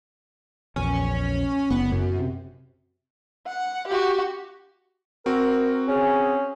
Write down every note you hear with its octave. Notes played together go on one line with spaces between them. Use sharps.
A#1 E2 C#4
F#1 B3
F#2
C3
F#5
F#4 G4
C4 F#4 A#4
C#4 G#4